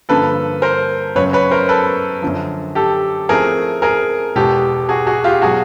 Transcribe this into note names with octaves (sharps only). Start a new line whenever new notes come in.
G2 D3 F3 A#3 A4 B4
A#4 C5
F#2 C#3 F#3 B4 C#5
B4 C#5
A#4 C5
A4 B4
F#2 D3 F3
G4 A4
A2 F3 A3 C4 G#4 A#4
G#4 A#4
E2 B2 G#3 B3 G4 A4
F#4 G#4
F#4 G#4
F4 G4
B2 F#3 F#4 G#4